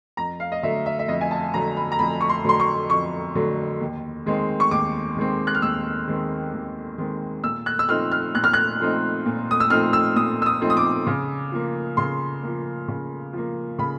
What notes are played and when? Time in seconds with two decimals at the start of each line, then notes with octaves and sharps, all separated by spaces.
0.17 F2 A#5
0.40 F5
0.52 D#5
0.63 D3 F#3 A3 E5
0.86 E5
0.99 E5
1.08 F2 D#5
1.21 G#5
1.31 A5
1.54 D3 F#3 A3 A#5
1.77 B5
1.92 A#5
1.99 F2 B5
2.21 C#6
2.29 C6
2.44 D3 F#3 A3 C6
2.60 C#6
2.90 F2 C#6
3.35 D3 F#3 A3
3.80 D#2
4.26 D#3 G#3 C4
4.60 C#6
4.71 D#2 D6
5.17 D#3 G#3 C4
5.47 F#6
5.55 F6
5.62 D#2 E6
6.08 D#3 G#3 C4
6.53 D#2
6.98 D#3 G#3 C4
7.44 A#2 E6
7.66 F#6
7.79 E6
7.89 F3 A3 C4 D#4 F6
8.12 F6
8.35 A#2 F#6
8.44 F6
8.53 F#6
8.80 F3 A3 C4 D#4
9.26 A#2
9.51 D#6
9.60 E6
9.70 F3 A3 C4 D#4 F6
9.93 E6
10.16 A#2 D#6
10.42 E6
10.46 D#6
10.61 F3 A3 C4 D#4
10.70 D#6
10.77 D6
11.07 C#3
11.52 F3 A#3
11.97 C#3 C6
12.43 F3 A#3
12.88 C#3
13.33 F3 A#3
13.79 C#3 B5